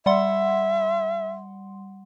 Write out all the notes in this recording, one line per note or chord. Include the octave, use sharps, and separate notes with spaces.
G3 E5 F#5 C6